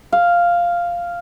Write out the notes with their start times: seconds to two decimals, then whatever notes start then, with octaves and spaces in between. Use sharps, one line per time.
0.12 F5